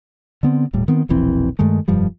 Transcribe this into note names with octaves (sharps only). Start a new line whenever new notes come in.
D3 B3 C4
D#1 A2 G3
D#3 B3 C4
E1 A#1 E3 C4
G2 D#3 G#3 A3
F1 G2 F3 G3